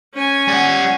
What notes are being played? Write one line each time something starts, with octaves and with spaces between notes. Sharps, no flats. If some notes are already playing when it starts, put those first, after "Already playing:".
C#4 G#5
G3 F#5